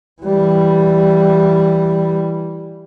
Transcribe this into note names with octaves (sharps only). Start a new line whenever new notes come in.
E3 G3